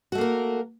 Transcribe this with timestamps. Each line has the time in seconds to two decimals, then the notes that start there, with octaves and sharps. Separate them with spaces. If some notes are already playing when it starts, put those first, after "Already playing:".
0.12 F#4
0.15 A3
0.18 A#3
0.21 A#4